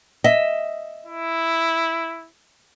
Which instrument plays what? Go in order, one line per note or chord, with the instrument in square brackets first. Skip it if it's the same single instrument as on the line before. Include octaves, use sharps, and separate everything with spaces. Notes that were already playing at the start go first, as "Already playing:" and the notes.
[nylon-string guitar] D#5 E5
[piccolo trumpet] E4